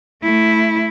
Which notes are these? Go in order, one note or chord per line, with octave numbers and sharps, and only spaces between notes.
A3 E4